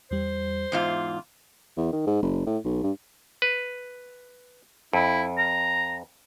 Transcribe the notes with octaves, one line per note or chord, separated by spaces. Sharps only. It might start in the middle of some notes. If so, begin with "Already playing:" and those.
E2 G3 C5
E2 G#2 F4 F5 D6 C7
E2
D#3
G#2
F#1
A2
B1
G2
B4
F2 E4
A#5